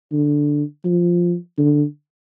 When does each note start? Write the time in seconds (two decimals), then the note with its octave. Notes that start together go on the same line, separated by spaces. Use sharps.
0.12 D3
0.85 F3
1.58 D3